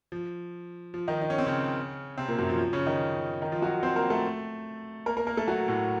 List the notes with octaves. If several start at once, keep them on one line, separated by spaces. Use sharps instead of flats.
F3
F3
D#3 D#4
D#4
C#4
C4
C#3 C#4
C3 C4
A#2 A#3
F#2 F#3
F3
F3
C#3 C#4
D#3 D#4
D#3 D#4
F3 F4
F#3 F#4
C4 C5
A#3 A#4
A3 A4
A#3 A#4
A#3 A#4
A#3 A#4
A3 A4
F#3 F#4
A2 A3